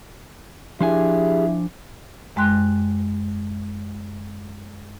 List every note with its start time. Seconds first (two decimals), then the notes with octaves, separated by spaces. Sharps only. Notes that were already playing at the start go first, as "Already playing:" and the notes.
0.81 F3 D4 E4 G4 G#4 G#5
2.36 F#2 G#3 G5 C6 F#6